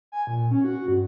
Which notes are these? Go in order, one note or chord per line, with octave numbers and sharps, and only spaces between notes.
G#5
A#2
C#4
F#4
G2